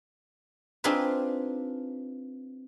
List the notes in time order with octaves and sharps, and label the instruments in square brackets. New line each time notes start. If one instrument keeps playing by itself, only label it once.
[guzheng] C4 D4 D#4 F4 G#4 B4